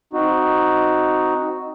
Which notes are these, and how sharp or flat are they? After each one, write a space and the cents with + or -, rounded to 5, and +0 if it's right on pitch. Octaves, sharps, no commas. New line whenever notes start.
C4 +0 D#4 +0 F#4 +0